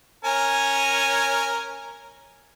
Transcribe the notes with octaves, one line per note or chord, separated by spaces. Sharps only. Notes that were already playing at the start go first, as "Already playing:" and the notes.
C#4 A#4 G#5